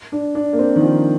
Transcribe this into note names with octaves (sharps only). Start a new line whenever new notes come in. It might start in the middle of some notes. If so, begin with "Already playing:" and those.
D4
D4
A#3
C4
D#3
F3